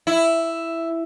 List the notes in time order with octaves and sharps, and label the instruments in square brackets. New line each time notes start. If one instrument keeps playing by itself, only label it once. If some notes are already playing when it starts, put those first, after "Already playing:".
[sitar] E4